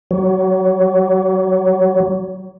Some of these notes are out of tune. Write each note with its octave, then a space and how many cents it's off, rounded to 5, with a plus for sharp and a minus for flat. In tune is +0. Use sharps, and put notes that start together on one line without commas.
F#3 +25